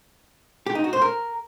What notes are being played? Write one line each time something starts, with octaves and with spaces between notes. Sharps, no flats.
G4
D#4
F#4
C5
A#4